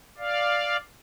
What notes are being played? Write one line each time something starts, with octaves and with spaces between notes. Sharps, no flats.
D5 F5